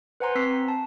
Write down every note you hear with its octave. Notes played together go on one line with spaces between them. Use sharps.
B4 C5 F#5 G#5 A#5 C6
C4 E6 B6 C7
A5